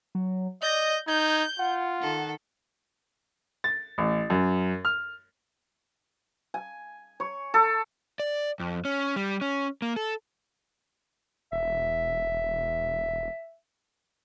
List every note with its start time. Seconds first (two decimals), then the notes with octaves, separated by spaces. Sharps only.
0.15 F#3
0.62 D5 D#5 G6 A#6
1.07 D#4 G6 G#6
1.59 F4 F#5
1.99 D#3 A4
3.64 A6
3.98 A1
4.30 F#2
4.85 F6
6.54 G#5
7.20 C#5
7.54 A4
8.20 D5
8.60 F2
8.85 C#4
9.16 G3
9.41 C#4
9.82 A#3
9.96 A4
11.52 E1 E5